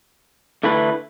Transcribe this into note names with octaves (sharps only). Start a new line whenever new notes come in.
D3 A3 E4 B4